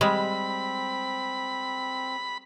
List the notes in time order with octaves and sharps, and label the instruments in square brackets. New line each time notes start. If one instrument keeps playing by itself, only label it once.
[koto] G3 G#3 [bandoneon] C4 [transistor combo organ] B5